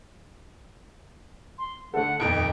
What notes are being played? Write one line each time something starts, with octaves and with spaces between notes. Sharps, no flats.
C6
D3 A3 A4 F#5
D#1 F2 D#4 D7